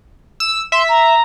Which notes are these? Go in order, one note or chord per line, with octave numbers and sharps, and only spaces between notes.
E6
E5 C6
A#5